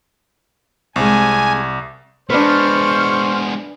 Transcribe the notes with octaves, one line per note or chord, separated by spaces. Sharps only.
C2 G#3 C4 G#5
G#3 B3 D4 B4 C5 C#6 F6